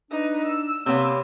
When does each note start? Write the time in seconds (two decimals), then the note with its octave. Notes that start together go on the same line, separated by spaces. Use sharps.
0.11 D4 D#4 B4
0.46 E6
0.86 C3 A#3 B3 C#5